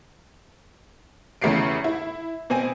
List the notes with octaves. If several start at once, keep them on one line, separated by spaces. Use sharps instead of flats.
E2 C#3 A3 G4 C7 D7
E4
B2 C4 G#5